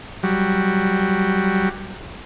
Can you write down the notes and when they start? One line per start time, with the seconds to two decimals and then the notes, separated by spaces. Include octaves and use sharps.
0.23 F#3 G3